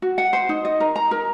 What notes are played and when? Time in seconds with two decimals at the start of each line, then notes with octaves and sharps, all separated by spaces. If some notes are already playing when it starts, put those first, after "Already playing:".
0.02 F#4
0.18 F#5
0.33 C5
0.49 D#4
0.65 D#5
0.80 A#4
0.96 A#5
1.11 A#4